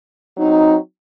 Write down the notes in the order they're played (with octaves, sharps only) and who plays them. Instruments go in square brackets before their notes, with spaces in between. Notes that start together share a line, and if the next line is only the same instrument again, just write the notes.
[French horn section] F#3 C4 D#4